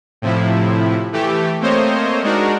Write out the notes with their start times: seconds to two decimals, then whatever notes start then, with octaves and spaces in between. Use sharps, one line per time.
0.22 A2 C3 F3 E4
1.12 E3 A3 G4
1.60 A3 A#3 C4 C5 C#5 D#5
2.23 G#3 D4 D#4 F#4 A#4